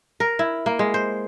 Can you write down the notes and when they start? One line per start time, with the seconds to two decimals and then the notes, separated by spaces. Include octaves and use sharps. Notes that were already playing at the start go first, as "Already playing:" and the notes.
0.20 A#4
0.39 E4
0.66 A#3
0.79 G#3
0.94 C5